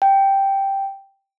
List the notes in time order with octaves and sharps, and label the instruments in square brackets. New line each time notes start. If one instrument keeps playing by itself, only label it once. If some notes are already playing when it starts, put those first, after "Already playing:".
[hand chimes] G5